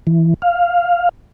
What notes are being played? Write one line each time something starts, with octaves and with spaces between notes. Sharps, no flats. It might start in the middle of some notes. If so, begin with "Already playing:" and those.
E3
F5